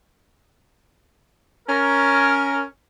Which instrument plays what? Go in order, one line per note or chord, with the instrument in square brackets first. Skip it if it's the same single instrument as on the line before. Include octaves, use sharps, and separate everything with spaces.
[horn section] C#4 A#4